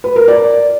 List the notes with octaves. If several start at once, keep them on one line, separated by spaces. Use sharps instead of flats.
B4
A#4
D5